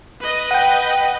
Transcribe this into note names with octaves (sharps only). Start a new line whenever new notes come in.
B4 D#5
F#5 G5